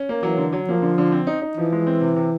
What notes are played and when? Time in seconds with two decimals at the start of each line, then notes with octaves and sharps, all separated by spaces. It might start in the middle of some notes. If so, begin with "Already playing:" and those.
Already playing: C#4
0.09 A#3
0.23 E3 F#3
0.38 D3
0.52 F#3
0.68 F3 A#3
0.82 D3
0.98 D3
1.12 C4
1.27 D#4
1.42 D#4
1.57 E3 F3
1.72 G#3
1.87 C4
2.01 C3
2.16 C3